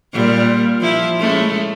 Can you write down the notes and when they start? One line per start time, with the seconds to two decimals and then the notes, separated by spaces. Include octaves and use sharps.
0.13 A#2 G3
0.81 F3 E4
1.18 G#3 A3 C#4